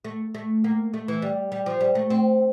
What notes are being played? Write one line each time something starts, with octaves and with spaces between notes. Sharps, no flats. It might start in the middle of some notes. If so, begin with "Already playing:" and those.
A3
A3
A#3
A3
E3
G3
G3
F3
G3
A3
C4